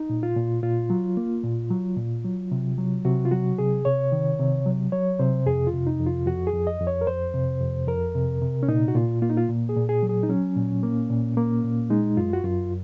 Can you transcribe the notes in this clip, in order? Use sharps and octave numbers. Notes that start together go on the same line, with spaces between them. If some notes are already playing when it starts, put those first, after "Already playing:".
Already playing: D#4
A#2
F4
A#2
A#2 F4
F#3
A#3
A#2
F#3
A#2
F#3
C3
F#3
C3 F#4
F4
F#3 F#4
C3 G#4
C3 C#5
D#3
C3
F#3
F#3 C#5
C3 C5
F2 G#4
F4
C3
D#4
F2
F4
F2 F#4
G#4
F2
D#5
F2
C#5
A#4
F2 C5
C3
F2
F2 A#4
C3
C3
C#4
A#2 D#4
F#4
A#2 F4
A#3 F4
D#4
F4
A#2
G#4
A#2
G#4
F#3
G#4
D#4
F#3 C#4
A#2
A#3
A#2
A#3
A#2
G#3 D#4
F#2 F4
F#4
F#2 F4